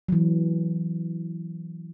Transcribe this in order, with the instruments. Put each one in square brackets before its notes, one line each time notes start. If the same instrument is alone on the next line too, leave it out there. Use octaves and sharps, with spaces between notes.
[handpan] E3 F#3